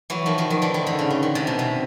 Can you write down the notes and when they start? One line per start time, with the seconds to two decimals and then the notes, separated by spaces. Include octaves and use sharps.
0.10 E3 F#3
0.26 D#3 F3
0.38 D#3 F3
0.50 D#3
0.62 D3 E3
0.74 D#3
0.87 D3
0.99 C#3
1.10 D3
1.23 D#3
1.35 C3
1.47 B2
1.59 C3